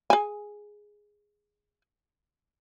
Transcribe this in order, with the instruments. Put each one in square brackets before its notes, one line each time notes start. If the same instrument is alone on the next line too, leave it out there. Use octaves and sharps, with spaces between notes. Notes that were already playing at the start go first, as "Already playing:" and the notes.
[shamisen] G#4 G#5